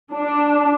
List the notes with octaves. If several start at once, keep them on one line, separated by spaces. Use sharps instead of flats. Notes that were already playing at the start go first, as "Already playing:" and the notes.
D4